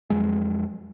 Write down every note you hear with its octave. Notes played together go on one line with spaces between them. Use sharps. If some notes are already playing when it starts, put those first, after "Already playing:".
F2 F#3 G#3